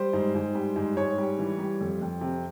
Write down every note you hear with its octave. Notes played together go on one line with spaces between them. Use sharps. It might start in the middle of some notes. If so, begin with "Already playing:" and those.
Already playing: G3 C5
G#2
G#2
G3
G#2
G#2 C#5
G3
E3
G3
F2
F2
C3